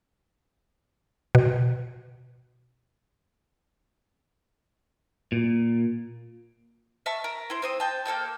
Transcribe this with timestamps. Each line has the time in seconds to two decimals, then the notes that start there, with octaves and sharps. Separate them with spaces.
1.35 B2
5.32 A#2
7.06 E5 A5 C#6
7.24 A#4
7.50 E4 C5
7.62 C4 C5 D#6
7.80 G5 A5
8.05 A#3 A4 G5 E6